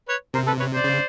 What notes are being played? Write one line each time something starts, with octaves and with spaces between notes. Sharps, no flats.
B4 C#5
C3 A#4 C5
A4 B4
B4 C#5
C5 D5
C#3